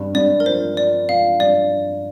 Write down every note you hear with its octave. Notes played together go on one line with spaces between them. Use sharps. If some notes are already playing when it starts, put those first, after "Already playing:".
Already playing: G2
G2 D5
A#4
F3 C5
F4 D5
F3 F5
G2 D5